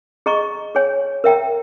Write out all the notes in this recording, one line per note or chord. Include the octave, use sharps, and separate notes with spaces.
G#4 D#5 A#5 C#6
G#4 C#5 G#5
A#4 E5 G5 A#5